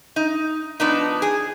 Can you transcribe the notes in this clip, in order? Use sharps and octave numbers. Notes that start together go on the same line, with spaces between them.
D#4
F3 B3 D4 D#4
G#4